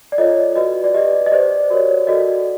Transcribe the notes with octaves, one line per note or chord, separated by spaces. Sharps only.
D5
F4 A4 C#5 D#5
F#4 B4 D5 D#5
D5
G4 B4 D5 D#5
D#5
G4 C5 D5
F#4 A#4 C#5
F#4 A4 D5 D#5